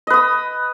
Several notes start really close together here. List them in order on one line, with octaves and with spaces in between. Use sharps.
D#5 B4 D#6 B5